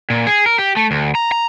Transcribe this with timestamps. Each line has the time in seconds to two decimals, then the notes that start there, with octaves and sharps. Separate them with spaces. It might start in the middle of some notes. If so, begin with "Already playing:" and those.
0.10 A#2
0.27 G#4
0.46 A#4
0.58 G4
0.77 A3
0.91 D2
1.15 A#5
1.32 A#5